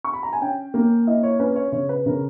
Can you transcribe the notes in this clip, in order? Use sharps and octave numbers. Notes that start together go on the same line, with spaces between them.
C#6
B5
A#5
G#5
C#4 G5
A#3
E4 D#5
C#5
C#4 B4
C#5
C#3 C#5
B4
C#3 A#4